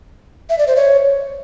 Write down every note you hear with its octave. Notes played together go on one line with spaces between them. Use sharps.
E5
D5
C5
C#5